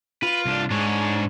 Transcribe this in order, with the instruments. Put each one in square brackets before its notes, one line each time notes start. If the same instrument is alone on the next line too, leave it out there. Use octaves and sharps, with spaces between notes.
[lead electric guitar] F4 [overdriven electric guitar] B4
[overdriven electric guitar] C2 D4
[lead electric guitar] G#2 [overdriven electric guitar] D4 C#5